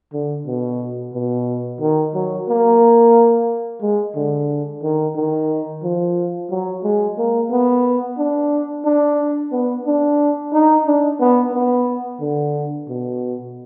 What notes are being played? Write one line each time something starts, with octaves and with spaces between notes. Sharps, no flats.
D3
B2
B2
D#3
F#3
A#3
G#3
D3
D#3
D#3
F3
F#3
G#3
A#3
B3
D4
D4
B3
D4
D#4
D4
B3
B3
D3
B2